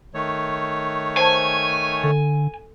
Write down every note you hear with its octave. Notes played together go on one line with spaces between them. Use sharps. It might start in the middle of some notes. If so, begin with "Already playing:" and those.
D#3 A3 C#5
C5 G#5 A5
D3 A4